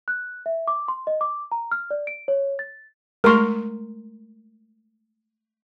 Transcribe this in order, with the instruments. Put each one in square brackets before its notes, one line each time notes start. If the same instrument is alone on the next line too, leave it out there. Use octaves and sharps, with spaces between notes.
[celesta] F#6
E5
D6
C6
D#5
D6
A#5
F6
D5
D7
C#5
A6
[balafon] G#3 A3 C#6 [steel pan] A#4 C6